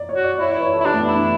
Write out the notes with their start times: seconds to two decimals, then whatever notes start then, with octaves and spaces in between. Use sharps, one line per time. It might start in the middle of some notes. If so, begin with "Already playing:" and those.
Already playing: D5
0.09 C#5
0.16 F#4
0.24 D5
0.38 E4 C#5
0.50 D5
0.57 B4
0.62 C#5
0.74 A4
0.80 E4
0.85 D4 G4
0.93 A3
1.00 B3
1.08 E4
1.15 D4